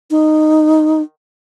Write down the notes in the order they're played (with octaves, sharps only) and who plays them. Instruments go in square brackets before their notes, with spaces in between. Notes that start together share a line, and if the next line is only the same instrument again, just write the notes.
[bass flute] D#4